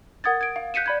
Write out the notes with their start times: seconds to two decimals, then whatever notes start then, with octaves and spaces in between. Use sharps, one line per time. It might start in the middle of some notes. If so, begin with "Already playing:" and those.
0.24 A#4 F#5 D#6 G#6 A6
0.41 G#6 D7
0.56 F5
0.74 F#6 G6 B6 C#7 D#7 E7
0.86 D5 B5 G#6